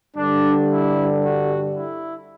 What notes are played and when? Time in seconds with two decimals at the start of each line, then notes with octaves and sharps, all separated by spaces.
0.16 G2 D3 G3 D4
0.69 E4
1.23 F#4
1.76 E4